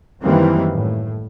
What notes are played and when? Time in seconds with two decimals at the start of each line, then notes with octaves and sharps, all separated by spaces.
0.22 F#2 D#3 E3 G3 A#3 C4
0.73 A2